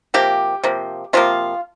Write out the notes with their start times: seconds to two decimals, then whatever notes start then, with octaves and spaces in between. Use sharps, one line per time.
0.14 C3 F3 A#3 G4
0.63 C3 F3 A#3
1.13 C3 F3 A#3 F4